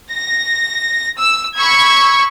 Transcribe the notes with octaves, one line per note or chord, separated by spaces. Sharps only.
A#6
E6
B5 C#6 E6 G#6